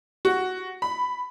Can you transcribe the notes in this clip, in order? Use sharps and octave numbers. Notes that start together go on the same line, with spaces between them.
F#4
B5